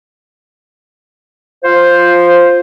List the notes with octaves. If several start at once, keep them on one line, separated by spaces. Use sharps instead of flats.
F4 C5